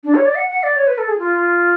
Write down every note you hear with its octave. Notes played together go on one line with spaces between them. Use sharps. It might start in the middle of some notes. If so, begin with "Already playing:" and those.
D4
C#5
D5
F#5
F#5
D5
C#5
B4
A4
G#4
F4